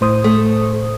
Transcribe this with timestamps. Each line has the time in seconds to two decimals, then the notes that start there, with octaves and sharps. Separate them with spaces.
0.01 A2 C5 D#6
0.24 A3